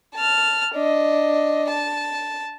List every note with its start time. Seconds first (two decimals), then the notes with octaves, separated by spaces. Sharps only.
0.15 A5 F6
0.74 D4 D#5
1.69 A5